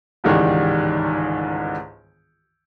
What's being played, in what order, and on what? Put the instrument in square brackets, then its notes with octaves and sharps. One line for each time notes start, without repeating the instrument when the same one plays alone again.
[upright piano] G1 C#2 G#2 D#3 E3 G3